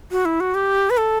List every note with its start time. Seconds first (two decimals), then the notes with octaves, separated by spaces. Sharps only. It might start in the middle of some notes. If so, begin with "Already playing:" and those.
0.11 F#4
0.25 E4
0.40 F#4
0.55 G4
0.90 B4
0.97 A4